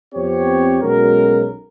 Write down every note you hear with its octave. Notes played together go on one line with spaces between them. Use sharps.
F2 B3 C4 G4 C#5
B1 G#3 C#4 F#4 A#4